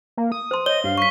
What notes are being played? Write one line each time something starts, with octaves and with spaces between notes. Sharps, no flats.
A#3
D#6
C5 C6
C#5 D#5 G7
G2 F5
C#6 B6